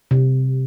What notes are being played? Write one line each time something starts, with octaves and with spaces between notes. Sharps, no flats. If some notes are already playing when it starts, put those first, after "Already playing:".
C3